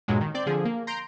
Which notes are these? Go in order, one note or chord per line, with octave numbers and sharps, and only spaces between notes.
G2 A#2 F#3 G#3
D#3
C4 D5 G6
D3 F3 G#4
A#3
A#5 C6 G6 D7